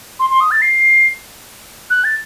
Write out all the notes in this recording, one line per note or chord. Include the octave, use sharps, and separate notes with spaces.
C6
C6
D#6
A6
C7
F#6
A6